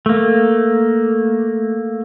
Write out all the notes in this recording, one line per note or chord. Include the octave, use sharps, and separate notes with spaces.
A3 A#3